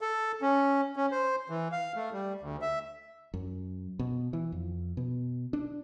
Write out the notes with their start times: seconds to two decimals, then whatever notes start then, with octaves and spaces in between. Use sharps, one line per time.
0.01 A4
0.42 C#4
0.96 C#4
1.11 C5
1.50 E3
1.72 F5
1.96 A3
2.13 G3
2.41 D2
2.61 E5
3.34 F#2
3.99 B2
4.33 E3
4.52 F2
4.97 B2
5.53 D4